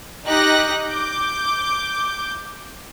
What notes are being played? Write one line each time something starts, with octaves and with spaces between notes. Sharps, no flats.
D#4 G4 F#6 A#6
D6 G6